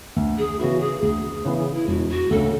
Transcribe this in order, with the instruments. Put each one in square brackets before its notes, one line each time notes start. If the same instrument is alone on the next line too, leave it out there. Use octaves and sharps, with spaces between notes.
[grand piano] D2
[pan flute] G#4
[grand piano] C#3 E3 B3 E4 [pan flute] F#4
[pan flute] G#4
[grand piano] D2 [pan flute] G#4
[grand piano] C#3 E3 B3 E4
[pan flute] E4
[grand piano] E1 [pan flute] F#4
[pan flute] F#4
[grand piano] D2 C#3 [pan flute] A4